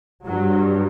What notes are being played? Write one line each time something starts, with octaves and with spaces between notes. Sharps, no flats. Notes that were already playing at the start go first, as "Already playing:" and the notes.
G2 F#3